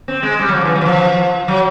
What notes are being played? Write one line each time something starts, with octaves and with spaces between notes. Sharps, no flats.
C4
G#3
G3
F#3
F3
E3
F#3
E3
F3
F#3